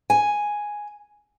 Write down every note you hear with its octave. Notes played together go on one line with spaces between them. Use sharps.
G#5